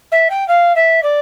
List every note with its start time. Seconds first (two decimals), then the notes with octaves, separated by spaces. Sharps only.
0.12 E5
0.30 G5
0.48 F5
0.76 E5
1.03 D5